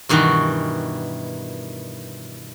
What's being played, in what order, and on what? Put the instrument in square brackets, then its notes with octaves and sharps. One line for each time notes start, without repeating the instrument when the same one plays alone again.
[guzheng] G2 B2 D#3 E3 F#4